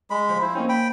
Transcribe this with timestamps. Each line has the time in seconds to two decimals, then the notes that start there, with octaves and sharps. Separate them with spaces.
0.10 G#3 B5
0.29 F3
0.42 E4 C5
0.55 A#3 C4 C#4 D#4
0.69 G5 B5